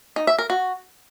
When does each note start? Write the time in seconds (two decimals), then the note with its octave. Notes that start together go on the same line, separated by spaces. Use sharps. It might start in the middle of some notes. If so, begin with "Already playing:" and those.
0.16 D#4
0.27 E5
0.39 A#4
0.50 F#4